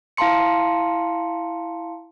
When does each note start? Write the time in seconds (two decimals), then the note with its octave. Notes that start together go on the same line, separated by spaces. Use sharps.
0.17 E4 F5 A5 A#5 C6 C#7